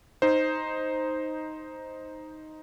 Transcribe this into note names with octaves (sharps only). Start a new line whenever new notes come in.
D#4 C5